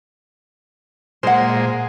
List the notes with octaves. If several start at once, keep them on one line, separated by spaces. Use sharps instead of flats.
A#2 G#3 C5 F#5